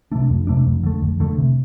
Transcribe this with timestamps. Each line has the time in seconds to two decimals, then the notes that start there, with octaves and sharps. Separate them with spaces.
0.12 C3 A3 D4
0.30 F2
0.47 C3 A3 D4
0.66 F2
0.83 D3 A3
1.02 F2
1.20 D3 A3
1.38 C3